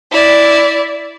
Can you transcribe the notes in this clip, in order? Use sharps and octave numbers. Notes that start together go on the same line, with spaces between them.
E4 D5